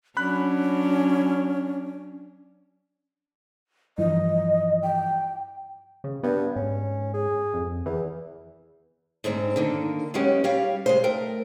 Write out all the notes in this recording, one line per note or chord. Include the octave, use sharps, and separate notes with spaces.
F#3 C#4 D4 B5 F#6
G2 E3 F3 D#5
G5
C#3
G2 B3
G#2 C#4
G#4
F2
E2 E3
G#2 D3 C4 D4 D#4
D3 D#3 A#3
F#3 G#3 A#3 B3 C#4 G4
G3 G4 C#5 F5
C#3 G#3 C5
A3 A#4 G5